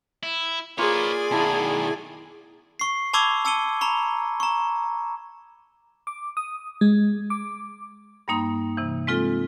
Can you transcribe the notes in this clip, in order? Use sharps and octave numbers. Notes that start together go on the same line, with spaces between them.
E4
A#3 F4 G#4 B4 C#5 D5 G#5
B2 D#3 E4 A5 B5
C#6 C7
A5 B5 C#6 D6 E6 G#6
A5 E6 C#7 D#7 G7
A#5 B5 C#6
A#5 C#6
D6
D#6
G#3
D6
G2 G3 A#3 D#4 C6
C3 E3
G#3 C4 F4 A4